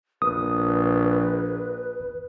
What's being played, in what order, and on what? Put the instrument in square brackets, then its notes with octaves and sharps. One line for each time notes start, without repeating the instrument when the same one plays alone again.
[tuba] A#1 [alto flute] B4 [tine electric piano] D#6